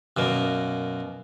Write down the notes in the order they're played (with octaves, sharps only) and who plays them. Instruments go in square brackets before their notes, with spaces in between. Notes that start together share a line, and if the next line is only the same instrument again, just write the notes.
[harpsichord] F#2 B2 A#3